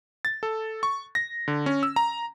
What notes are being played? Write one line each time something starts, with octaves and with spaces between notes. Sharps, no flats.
A6
A4
C#6
A#6
D3
C#4
E6
A#5